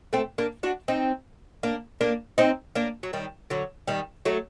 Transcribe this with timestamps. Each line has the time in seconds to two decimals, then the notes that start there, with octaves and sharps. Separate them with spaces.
0.13 A3 C4
0.38 A#3 D4
0.63 D4 F#4
0.88 C4 D#4
1.63 A#3 D4
2.01 A#3 D4
2.38 C4 D#4
2.75 A#3 D4
3.03 F#3
3.13 D#3 G3
3.50 D3 F#3
3.87 D#3 G3
4.25 F#3 A3